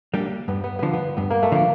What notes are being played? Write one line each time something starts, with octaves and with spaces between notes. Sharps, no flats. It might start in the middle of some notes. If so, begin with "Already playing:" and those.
G3 A#3 D4 G4
G2 B3
B3
D3 F3 B3
B3
G2 B3
A#3
A3
D3 F3 A#3